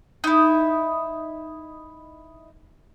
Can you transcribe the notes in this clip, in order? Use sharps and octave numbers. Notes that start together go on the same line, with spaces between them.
D#4 E4